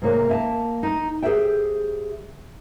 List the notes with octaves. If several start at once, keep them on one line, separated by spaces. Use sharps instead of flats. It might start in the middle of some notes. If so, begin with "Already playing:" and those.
G#2 C3 A#3 C#5
A#3 E5 G#5 A5
D#4
G4 G#4 B4 C5 E5 G5